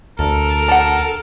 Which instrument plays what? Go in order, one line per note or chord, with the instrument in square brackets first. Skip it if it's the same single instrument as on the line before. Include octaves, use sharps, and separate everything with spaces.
[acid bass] D2 [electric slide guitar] A4 [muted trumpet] A#4
[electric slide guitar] A4 [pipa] F#5 A5